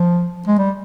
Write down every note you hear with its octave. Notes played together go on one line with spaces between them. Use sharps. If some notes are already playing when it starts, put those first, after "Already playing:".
Already playing: F3
G#3
G3